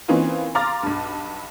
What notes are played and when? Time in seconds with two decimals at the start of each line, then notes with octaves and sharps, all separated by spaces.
0.08 E3 A#3 C4 C#4 D#4 F4
0.55 F5 A#5 C6 D6 F6 A6
0.83 B1 G2